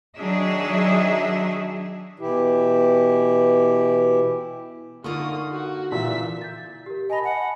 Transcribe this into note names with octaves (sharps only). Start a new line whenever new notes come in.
D#3 F#3 D4 D#4 G#4 E5
B2 E3 E4 G4
D3 A#3 D#4 F4 C#6 D#6
F#4
A#2 E3 E5 B6
G6 A6
G4 A#4
D#5 G#5 A5 B5
F#5